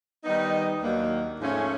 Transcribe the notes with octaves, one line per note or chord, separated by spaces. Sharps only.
D#3 G3 B3 D#4
D#2 D#3 F#3 A#3 D4
G#2 F3 A3 C#4